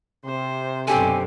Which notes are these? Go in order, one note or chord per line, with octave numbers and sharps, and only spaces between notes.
C3 C5
F#2 B2 D3 C4 G4 A4 G#5